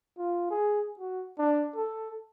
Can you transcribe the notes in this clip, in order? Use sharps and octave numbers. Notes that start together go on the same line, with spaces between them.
F4
G#4
F#4
D4
A4